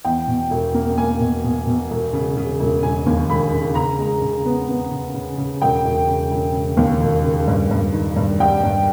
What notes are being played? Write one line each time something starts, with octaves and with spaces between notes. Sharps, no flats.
E2 G5
B2
E1
A#3
A#3 G#5
B2
B2
B2
E1
C#3
C#3
E1
E1 G#5
D#2
E1 B5
C#3
C#3 A#5
G#3
C#3
B3
B3
C#3
C#3
C#3
E1 G5
E1
C#3
E1
C#3
D#2
E1
C#3
G2
G2
D#3
G2
G3 G5
G2